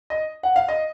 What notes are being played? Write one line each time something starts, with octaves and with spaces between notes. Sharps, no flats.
D#5
F#5
F5
D#5